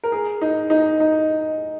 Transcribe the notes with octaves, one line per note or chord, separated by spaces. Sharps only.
A#4
G#4
D#4
D#4
D#4